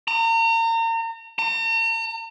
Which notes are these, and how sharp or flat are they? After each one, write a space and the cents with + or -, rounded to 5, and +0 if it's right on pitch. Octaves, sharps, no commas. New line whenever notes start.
A#5 -35
A#5 -45